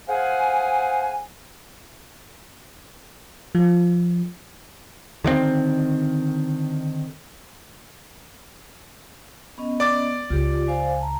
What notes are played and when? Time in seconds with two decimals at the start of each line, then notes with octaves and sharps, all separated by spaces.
0.09 G#4 C5 F5 F#5 G#5
3.55 F3
5.24 D3 D#3 A3 C4
9.58 B3 C#4 D#5
9.80 D5 D6 A6
10.30 C#2 F4 G4
10.68 C5 F5 G#5
11.01 A5 A#5